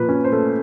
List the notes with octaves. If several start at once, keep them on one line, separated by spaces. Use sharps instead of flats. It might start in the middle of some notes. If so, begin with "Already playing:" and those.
Already playing: A#2 F3 B4
C#4
C5
A3